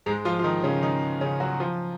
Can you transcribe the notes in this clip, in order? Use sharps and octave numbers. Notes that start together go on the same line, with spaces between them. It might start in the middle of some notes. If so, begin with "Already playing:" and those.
G#2 G#3
F3 F4
F4
D#3 D#4
C#3 C#4
D#3 D#4
C#3 C#4
F#3 F#4
F3 F4